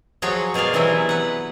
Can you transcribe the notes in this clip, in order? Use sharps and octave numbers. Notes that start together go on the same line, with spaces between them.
F3 F#3 F#4 G#4 C#5
B2 G#4 A#4 D5 F5
C3 E3 F#3 B3 E4 G#5
B4 F#5